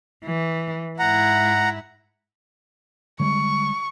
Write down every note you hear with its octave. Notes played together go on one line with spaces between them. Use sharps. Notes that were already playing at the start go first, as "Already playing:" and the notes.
E3
G#2 E4 F#5 A#5
D3 G3 G#3 C#6